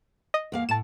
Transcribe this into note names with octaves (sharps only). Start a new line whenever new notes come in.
D#5
E2 A#3 F5
A2 A5 E7